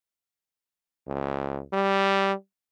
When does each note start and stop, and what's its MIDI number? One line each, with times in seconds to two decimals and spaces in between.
1.07 1.61 37
1.73 2.33 55